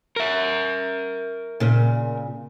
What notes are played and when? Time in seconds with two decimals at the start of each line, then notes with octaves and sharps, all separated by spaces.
0.16 A#4 E5
1.60 A#2 C#3